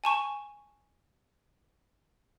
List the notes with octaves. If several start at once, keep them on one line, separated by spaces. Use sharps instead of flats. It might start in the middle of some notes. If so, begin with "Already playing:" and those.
G#5 A5 C#6